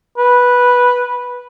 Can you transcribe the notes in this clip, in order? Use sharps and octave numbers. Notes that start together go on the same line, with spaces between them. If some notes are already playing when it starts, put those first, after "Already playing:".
B4